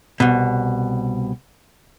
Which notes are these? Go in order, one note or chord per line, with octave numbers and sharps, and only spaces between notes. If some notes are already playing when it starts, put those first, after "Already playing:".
C2 B2